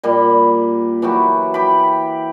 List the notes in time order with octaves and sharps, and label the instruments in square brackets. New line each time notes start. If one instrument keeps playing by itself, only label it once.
[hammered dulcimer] A#2 G3
E3 F#3 F#4 G4
G4 G5 B5